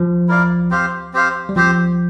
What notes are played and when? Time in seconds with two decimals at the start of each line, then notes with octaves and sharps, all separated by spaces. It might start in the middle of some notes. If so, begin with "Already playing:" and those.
Already playing: F3
0.28 E4 A#4 D5 F5
0.70 C4 G4 C5 F5
1.14 C4 G4 C5 F5
1.49 G3
1.56 F3 C4 G4 C5